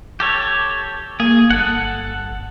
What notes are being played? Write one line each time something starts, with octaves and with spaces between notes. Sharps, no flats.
G4 A4 C#5
A#3 G#4
G1 A4 F#5